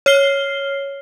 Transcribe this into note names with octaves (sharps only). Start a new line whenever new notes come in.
C#5 F6 C7 G7